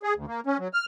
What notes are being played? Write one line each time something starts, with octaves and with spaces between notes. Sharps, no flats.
G#4
D2
A#3
C#4
F#3
F6